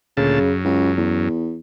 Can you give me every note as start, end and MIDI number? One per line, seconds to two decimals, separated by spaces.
0.17 0.39 38
0.17 0.39 46
0.17 0.53 49
0.17 0.39 81
0.40 1.29 42
0.65 0.92 37
0.97 1.60 40